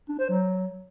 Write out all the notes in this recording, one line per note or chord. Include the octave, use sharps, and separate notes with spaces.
D4
C5
F#3